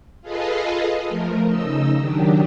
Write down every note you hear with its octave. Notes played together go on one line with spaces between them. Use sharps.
F4 G#4 A4 B4 D#5 F5
F3 A3 A#4
C#3 D#4 D#5 E6
D#3 F#3 D4 G4